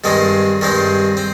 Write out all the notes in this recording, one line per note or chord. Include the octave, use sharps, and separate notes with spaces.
G2 D#3 G#3 C4
G2 D#3 G#3 C4
C4